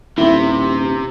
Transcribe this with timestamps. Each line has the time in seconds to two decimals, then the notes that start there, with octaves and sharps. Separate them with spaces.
0.18 D#1 C3 E4